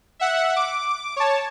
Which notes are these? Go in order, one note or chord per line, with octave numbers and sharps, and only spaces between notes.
E5 F#5
D6
C#5 A5